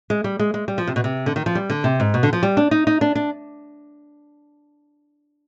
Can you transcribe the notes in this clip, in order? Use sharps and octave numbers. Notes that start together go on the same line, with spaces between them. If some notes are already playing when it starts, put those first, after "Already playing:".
G#3
G3
G#3
G#3
G3
F3
C3
B2
C3
D3
D#3
F3
G3
D3
C3
G#2
B2
D3
F3
G3
D4
D#4
D#4
D4
D4